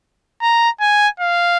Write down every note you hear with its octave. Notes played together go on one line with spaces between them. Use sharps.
A#5
G#5
F5